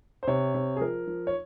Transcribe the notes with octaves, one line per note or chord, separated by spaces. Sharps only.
C5
C3 C#5
C3
G#4
F3 A#4
F3
C#5